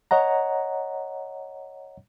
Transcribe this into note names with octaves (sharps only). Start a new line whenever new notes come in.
C#5 D#5 F#5 A#5